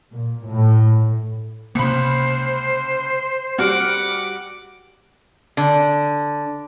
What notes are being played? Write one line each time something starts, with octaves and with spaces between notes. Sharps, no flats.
A#2
A2
C#2 C3 A#3 C5 B5
G3 F#4 F#5 D6 F6
D3